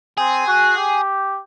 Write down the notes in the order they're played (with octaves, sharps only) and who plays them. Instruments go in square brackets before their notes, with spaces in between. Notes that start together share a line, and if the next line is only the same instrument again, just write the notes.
[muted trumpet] C4 [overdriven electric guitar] G#4
[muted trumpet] F#4
G4